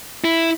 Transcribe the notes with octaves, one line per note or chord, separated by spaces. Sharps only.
E4